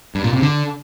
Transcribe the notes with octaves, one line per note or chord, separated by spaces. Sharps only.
G2
A#2
C3
D3